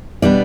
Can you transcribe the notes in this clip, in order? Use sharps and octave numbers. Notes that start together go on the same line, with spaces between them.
B2 G3 B3 D4 D5